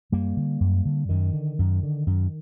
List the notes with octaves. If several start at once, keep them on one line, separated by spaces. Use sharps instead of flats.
F#2 G3 A#3
D3
F#2
D3
F#2 D#3
D3
F#2
D3
F#2